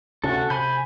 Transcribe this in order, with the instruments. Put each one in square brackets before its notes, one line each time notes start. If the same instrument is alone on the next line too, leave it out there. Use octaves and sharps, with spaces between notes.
[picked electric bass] D2 C3 C#4 [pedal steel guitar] F#4 A4
[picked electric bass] C3 [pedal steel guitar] G#5 B5 G6